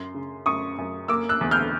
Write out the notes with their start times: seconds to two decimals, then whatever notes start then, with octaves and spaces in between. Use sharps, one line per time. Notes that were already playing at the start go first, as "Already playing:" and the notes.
Already playing: F#2 C6
0.14 C#3
0.46 F#2 C#6 D#6
0.78 F#2
1.08 A#3 D6 E6
1.29 E6 F#6
1.41 E2
1.51 F6 G6